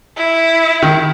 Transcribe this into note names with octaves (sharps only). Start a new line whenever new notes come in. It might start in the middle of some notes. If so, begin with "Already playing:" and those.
E4
D#3